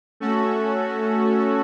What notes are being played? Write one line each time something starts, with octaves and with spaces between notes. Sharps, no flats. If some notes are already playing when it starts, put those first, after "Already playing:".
A3 C#4 F#4 A4